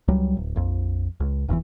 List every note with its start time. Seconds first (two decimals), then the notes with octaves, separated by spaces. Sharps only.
0.08 C#2 F#3 G3
0.37 D1
0.56 A#1 F2
1.20 C#2
1.48 F1 E2 A#2 E3